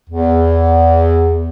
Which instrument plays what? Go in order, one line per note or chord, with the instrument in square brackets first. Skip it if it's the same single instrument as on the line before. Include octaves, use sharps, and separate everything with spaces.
[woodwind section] E2